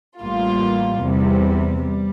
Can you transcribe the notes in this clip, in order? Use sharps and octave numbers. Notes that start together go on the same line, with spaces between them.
A1 A2 G3 A#3 F4
E2 C3 G3
G3